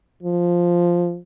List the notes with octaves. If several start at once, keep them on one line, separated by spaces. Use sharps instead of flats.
F3